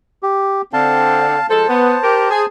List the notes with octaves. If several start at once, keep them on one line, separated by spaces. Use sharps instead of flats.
G4
D3 C4 F5 A5
F3 G#3 A4 C5 A5
B3
G4 A#4
G#4